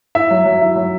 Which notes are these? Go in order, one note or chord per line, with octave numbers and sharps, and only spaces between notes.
E4 E5
F#3
F#3
E4
F#3